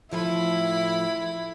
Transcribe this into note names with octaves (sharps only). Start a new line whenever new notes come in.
A2 F3 E4 A4 B5